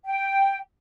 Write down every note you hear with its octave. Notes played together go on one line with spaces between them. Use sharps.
G5